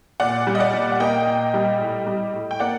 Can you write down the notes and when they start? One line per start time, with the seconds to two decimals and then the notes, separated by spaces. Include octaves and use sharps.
0.20 A#2 D5 F#5
0.47 G3
0.55 D#5
0.60 D5 F#5
0.73 A#2
0.92 F#5
1.00 A#3 D#5 G5
1.27 A#2
1.54 G3
1.80 A2
2.07 G3
2.33 A2
2.51 G5
2.60 A#3 D5 F#5